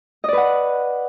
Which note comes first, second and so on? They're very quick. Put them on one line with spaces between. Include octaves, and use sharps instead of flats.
D#5 D5 B4 F#5